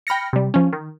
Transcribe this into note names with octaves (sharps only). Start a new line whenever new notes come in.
G5 B5 F6 A#6 C#7
C3 G3
F3 C#4
D#3